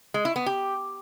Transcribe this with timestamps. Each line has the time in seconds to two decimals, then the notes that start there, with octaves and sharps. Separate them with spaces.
0.14 G#3
0.25 E4
0.36 B3
0.46 G4